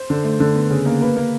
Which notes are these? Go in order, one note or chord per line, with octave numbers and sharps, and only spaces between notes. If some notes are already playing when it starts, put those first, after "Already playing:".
Already playing: C5
D3
A3
D3
B3
C#3
A#3
A#3 B4
A#3